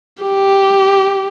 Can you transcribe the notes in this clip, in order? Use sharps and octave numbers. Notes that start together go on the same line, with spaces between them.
G4